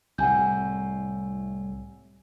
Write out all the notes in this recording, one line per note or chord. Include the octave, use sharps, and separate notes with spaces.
C2 A2 F#5 G#5 G6